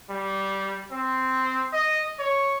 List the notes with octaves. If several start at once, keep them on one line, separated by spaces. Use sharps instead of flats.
G3
C4
D#5
C#5